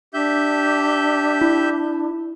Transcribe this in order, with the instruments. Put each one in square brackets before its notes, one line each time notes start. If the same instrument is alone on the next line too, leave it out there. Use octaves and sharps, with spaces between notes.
[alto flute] D4 [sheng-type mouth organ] G4 E5 G6
[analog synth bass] E4